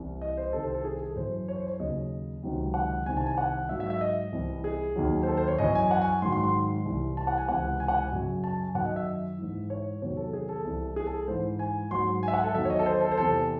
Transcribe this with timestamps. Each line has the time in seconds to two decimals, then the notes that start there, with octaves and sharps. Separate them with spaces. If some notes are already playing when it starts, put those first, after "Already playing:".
Already playing: C2 C3 E3
0.22 D#5
0.37 C5
0.53 C2 C3 D#3 A4
0.63 C5
0.74 A4
0.84 G#4
1.00 A4
1.16 F#2 E3 C5
1.48 C#5
1.57 C5
1.67 C#5
1.80 D#2 C#3 F#3 D#5
2.43 C#2 C3 D#3 F#3
2.74 F#5
3.06 C2 C3 D#3 G#5
3.17 A5
3.27 G#5
3.38 F#5
3.69 G#2 F#3 E5
3.80 E5
3.90 E5
4.01 D#5
4.32 C2 C3 E3
4.64 G#4
4.96 D#2 D#3 F#3
5.23 C5
5.28 A4
5.37 C5
5.48 C#5
5.58 F#2 E3 D#5
5.75 G#5
5.91 F#5
6.02 G#5
6.22 G#2 D#3 F#3 C6
6.32 C6
6.44 C6
6.85 C2 C3 E3
7.17 A5
7.27 F#5
7.38 G#5
7.49 C#2 C3 E3 F#5
7.80 G#5
7.88 F#5
7.97 G#5
8.12 F#2 C#3 F#3
8.44 A5
8.59 G#5
8.75 F#2 D#3 F#3 F#5
8.85 D#5
8.96 E5
9.38 G#2 E3
9.70 C#5
10.02 E2 C3 D#3 F#3 C#5
10.17 A4
10.33 G#4
10.49 A4
10.65 C2 C3 E3
10.96 G#4
11.07 A4
11.18 A4
11.28 G#2 E3 C5
11.59 G#5
11.91 G#2 F#3 C6
12.23 G#5
12.28 E5
12.33 F#5
12.44 A4
12.54 E2 D#3 F#3 E5
12.65 C#5
12.70 D#5
12.79 A4
12.86 C5
13.01 A4
13.11 C5
13.17 E2 C3 E3 A4